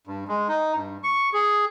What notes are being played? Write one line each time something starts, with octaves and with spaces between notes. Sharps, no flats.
G2
G#3
D#4
G2
C#6
G#4